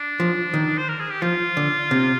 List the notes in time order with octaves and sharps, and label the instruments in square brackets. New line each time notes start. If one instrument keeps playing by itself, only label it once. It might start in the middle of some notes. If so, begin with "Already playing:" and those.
Already playing: [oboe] D4
[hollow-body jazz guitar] F3
D#3
[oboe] C5
A#4
G#4
G4
[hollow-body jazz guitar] F3 [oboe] F4
[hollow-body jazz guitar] D3
C3